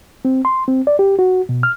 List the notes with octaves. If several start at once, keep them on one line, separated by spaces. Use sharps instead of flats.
C4
C6
C4
D5
G4
F#4
B2
F6